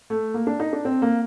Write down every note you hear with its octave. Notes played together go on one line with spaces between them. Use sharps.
A3
A#3
D4
D#4
D4
C4
A#3